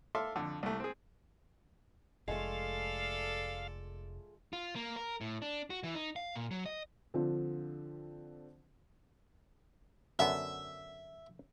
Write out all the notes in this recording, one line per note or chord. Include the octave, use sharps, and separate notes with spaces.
A4 E5 F5 C6 D6
F2 D3
C2 A3
C4 G#4
F1 G#3 A3 F4 A4 D5 F5
F4
A#3
A#4
A2
D4
F#4
E3
D#4
F5
A#2
F#3
D#5
D3 F3 C4 D4 F4
F#2 D3 B3 E5